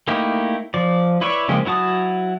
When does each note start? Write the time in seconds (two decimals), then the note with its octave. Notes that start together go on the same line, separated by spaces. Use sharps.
0.08 A3 A#3 D#4 E4 G4
0.74 F3 D5
1.21 E4 B4 C#5 D5 E5
1.48 C#3 F3 G#3 A#3 G4
1.65 F#3 E4 F#4 A5 D#6